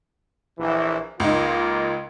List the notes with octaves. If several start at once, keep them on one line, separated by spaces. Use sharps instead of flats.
A#1 E3
C#2 A#3 D#4 F4